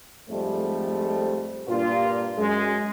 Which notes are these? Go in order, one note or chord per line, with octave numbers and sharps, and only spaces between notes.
F2 G#2 F3 G3 A3
G2 A#2 F4
F#2 G#3